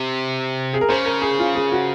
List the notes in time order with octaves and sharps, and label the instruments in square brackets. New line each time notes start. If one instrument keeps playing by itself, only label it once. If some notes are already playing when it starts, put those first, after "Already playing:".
Already playing: [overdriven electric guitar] C3
[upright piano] G#4
A#4
[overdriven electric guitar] C#3 [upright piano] C5
[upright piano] A#4
G#4
F4
G#4
F#4